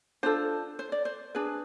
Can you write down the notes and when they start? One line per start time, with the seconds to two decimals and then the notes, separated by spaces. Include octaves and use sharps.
0.23 D4 F4 A4 C5
0.79 C5
0.92 D5
1.05 C5
1.35 D4 G#4 B4